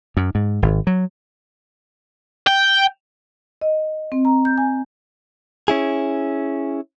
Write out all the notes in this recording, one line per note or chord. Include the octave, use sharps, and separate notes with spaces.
F#2
G#2
G#1
F#3
G5
D#5
C4
A#5
G6
G#5
C#4 E4 G#4